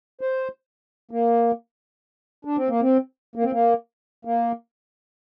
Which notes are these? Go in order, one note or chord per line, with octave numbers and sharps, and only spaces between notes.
C5
A#3
D4
C4
A#3
C4
A#3
C4
A#3
A#3